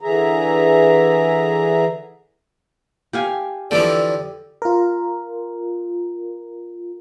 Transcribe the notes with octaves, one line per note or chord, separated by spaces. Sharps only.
D3 E3 G#4 E5 A#5
G4 F5 G#5
D3 E3 F3 G4 A4 D5 G5
F4 A#4